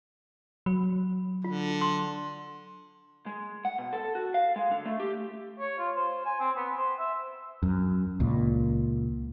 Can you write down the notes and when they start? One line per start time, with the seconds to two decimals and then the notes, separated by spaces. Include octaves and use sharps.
0.66 F#3 B5
1.44 D3 F4
1.81 C6
3.26 G#3
3.65 F#5
3.78 B2
3.93 A4
4.15 F#4
4.34 F5
4.56 G#3
4.71 D3
4.85 A3
5.00 G4
5.60 C#5
5.79 F4
5.96 C5
6.26 G#5
6.40 C4
6.57 B3
6.75 C5
7.00 E5
7.63 F#2
8.20 C#2 A#2